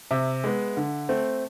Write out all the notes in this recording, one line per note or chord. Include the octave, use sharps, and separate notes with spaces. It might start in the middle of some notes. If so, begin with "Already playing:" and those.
C3 E5
G#3 B3
D3
A3 C4